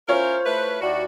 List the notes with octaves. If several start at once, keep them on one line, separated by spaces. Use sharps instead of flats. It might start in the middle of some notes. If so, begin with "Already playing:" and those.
C#4 E4 F4 A#4 C5 C#5
A3 E4 B4
D#2 E4 F#4 D5